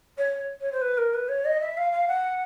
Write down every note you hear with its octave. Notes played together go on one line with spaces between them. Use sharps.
C#5
C#5
C5
B4
A#4
B4
C#5
D#5
E5
F5
F5
F#5